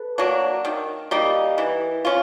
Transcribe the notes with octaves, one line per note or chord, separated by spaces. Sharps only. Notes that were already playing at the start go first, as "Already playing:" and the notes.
Already playing: A4 B4
F#3 A#3 D4
D#3
G3 A#3 D#4
E3
C#4 F4